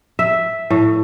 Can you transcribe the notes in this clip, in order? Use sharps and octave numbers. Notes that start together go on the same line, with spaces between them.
E5
A2